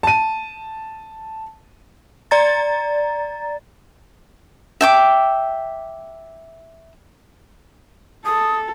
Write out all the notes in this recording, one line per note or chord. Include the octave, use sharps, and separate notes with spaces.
A5 D#7
D5 A#5 A6
E5 G5 D6
A4 D#6